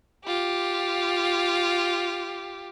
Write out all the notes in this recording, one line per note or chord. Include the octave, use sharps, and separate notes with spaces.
F4 G4